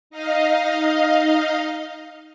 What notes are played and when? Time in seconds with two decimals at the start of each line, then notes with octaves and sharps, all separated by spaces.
0.10 D#4 D#5 F5